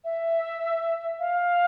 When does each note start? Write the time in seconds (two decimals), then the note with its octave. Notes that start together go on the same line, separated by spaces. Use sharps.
0.04 E5
1.19 F5